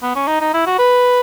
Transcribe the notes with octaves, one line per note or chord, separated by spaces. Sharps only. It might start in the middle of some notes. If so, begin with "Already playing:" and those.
B3
C#4
D#4
D#4
E4
F#4
B4